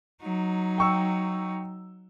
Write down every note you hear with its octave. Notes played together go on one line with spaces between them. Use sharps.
F#3 D#4
G5 C#6 E6